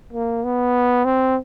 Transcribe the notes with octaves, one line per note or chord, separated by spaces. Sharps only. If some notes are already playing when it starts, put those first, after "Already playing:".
A#3
B3
C4